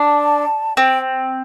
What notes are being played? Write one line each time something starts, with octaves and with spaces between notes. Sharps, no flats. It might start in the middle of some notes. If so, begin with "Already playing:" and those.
Already playing: D4 A5
C4 G5